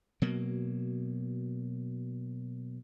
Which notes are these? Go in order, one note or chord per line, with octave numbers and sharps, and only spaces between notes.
B2 F#3 A#3